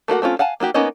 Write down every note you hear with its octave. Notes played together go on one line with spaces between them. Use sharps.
A3 A#3 F#4 F#5
A3 C4 C#4 F4
F5 F#5 G#5 A5
A#3 D#4 F#4 G4
A#3 B3 C#4 D#4 D#5